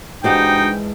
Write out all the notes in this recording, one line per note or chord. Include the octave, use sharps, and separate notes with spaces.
G#2 E3 D4 D#4 F#4 G4 G5 A5